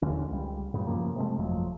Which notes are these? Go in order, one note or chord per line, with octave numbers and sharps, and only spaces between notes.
D#2 D3 C#4
C#2 G3
F#2 A2 C#3
G2 C#3 F3 A#3
C3 G#3 A3
G1 F2 F3 F#3